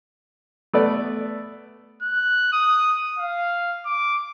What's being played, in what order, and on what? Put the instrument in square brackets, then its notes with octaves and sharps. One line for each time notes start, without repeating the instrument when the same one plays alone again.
[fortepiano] A3 B3 D5
[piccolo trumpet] F#6
D#6
F5
D6